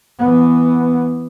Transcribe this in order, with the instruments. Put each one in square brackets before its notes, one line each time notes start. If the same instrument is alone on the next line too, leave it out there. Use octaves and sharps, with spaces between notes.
[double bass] E3 B3